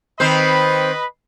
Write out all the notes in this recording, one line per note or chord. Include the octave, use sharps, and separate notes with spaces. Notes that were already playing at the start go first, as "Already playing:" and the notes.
D#3 C4 B4 C5 D#5 B5